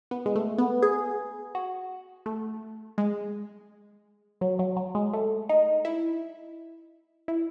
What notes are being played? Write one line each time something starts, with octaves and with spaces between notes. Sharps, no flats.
B3
G#3
A3
B3
G#4
F#4
A3
G#3
F#3
F#3
F#3
G#3
A3
D#4
E4
E4